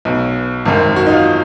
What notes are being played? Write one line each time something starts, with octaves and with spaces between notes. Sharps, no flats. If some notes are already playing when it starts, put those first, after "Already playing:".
B1 B2
G#1 F#2 D#3
F#4
D#4
F4